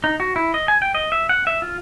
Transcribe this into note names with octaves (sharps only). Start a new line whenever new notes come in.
D#4
F#4
E4
D#5
G#5
G5
D#5
E5
F#5
E5
F4